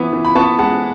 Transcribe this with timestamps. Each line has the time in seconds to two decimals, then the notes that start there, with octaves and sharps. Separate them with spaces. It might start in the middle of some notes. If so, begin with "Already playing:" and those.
Already playing: E3 B3
0.13 E3
0.25 B5
0.35 B3 A5 C#6
0.59 G#3 F#5 A5